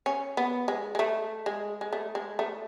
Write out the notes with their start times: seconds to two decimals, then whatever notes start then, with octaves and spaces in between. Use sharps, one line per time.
0.06 C#4
0.37 B3
0.68 G#3
0.95 G#3
0.99 A3
1.46 G#3
1.81 G#3
1.93 A3
2.15 G#3
2.39 A3